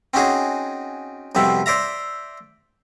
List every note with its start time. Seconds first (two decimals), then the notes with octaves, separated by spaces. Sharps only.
0.14 C4 C#4 D#4 F#4 G#4
1.35 C2 F2 B2 C4 E5
1.66 C5 D5 E5 A#5